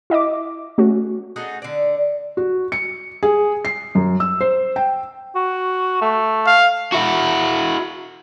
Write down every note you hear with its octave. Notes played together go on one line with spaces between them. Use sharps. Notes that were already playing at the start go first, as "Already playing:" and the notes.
E4 D#5 E5 D6
A3 C#4 F#4
D#4 F#4 G#4 A4
D3 D5
F#4
C#7
G#4
C7
F#2
E6
C5
G5
F#4
A3
F5
E4 F#4